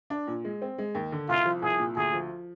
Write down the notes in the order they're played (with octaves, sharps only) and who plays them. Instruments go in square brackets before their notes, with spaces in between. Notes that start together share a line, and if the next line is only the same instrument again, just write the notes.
[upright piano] D4
A#2
G#3
C4
G#3
D#2
D3
[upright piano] C2 [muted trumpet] F4
[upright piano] F3
[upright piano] C2 [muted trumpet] G#4
[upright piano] A#2
[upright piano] D2 [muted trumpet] G#4
[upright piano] F3